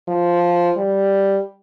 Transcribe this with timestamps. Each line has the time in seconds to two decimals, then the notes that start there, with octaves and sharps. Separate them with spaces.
0.08 F3
0.77 G3